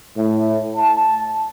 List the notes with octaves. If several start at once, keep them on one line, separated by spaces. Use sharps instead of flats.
A2
A5